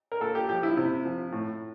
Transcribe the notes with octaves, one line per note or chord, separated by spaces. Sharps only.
A#4
A#2 A4
G4
F3 G4
E4
C3 E4
F3
A2